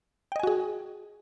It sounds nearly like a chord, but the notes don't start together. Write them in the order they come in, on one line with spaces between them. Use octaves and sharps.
G5 D#5 G#5 F#4 G#4